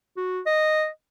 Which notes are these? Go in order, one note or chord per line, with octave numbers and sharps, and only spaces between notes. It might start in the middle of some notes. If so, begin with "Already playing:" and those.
F#4
D#5